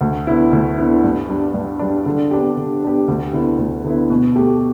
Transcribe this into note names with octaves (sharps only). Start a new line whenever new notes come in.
D2
D3 B3 E4
D2
D3 B3 E4
G2
G3 D4
G2
G3 D4
D3
B3 D4 G4
D3
B3 D4 G4
D2
D3 B3 E4
D2
D3 B3 E4
B2
A3 G4